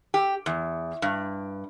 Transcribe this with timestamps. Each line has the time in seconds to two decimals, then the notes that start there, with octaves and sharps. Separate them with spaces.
0.14 G4
0.46 E2
1.02 G2